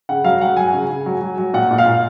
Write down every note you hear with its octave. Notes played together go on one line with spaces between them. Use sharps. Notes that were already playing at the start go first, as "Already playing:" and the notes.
C#3 F#5
F#3 F5
F#3 F#5
F#3 G#5
C#3
C#3
F#3
F#3
F#3
A#2 F#5
A#2
F5
A#2